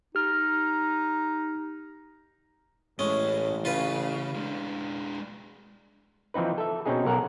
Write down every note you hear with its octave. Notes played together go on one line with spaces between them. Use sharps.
D#4 G4 F6
A1 A2 G#3 C#4
C#3 F4 B4
G#3 D4
E3 F3 C4 D#4 B4
A4 E5
B2 C4 C#4 D#4 G#4
B1 A#4 F#5 G#5 A#5